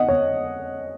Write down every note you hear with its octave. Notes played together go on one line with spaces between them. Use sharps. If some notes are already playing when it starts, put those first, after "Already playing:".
Already playing: D#5 F#5
C#5